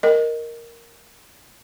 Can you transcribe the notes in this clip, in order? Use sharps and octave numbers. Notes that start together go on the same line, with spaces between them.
A#4 D#5